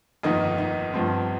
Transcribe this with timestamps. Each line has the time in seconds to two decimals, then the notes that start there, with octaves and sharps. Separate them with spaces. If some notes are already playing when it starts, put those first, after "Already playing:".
0.23 G1 F2 D#3 A#3 D#4
0.58 D#4
0.94 G1 G2 F3 C4